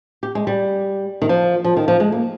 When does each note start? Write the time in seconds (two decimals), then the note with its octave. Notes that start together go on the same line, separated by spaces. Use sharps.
0.23 G4
0.35 G#3
0.47 G3
1.22 D#3
1.29 F3
1.64 F3
1.77 D#3
1.88 F3
2.00 G#3
2.12 A#3